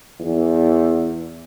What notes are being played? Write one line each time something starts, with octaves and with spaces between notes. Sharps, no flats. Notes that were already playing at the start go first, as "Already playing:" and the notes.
E2